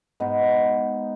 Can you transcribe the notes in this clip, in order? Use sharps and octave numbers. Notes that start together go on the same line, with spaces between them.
G#2 B3 D#4